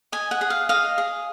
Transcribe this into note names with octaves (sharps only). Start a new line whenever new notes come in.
D#5 G#5
F#5
G#4
F5
D#5 F5
G#4